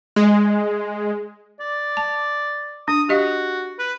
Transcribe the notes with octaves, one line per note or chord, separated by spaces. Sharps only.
G#3
D5
A5
D4 D#6
F#4 G4 D#5 F5
B4